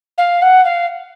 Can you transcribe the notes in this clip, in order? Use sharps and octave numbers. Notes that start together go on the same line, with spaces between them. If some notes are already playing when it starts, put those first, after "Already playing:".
F5
F#5
F5